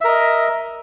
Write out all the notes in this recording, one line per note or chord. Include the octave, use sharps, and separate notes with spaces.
A#4 D#5 E5